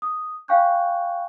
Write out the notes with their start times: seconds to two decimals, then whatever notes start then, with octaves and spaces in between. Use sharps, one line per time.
0.02 D#6
0.48 F5 G5 G#5 C#6 F#6 G6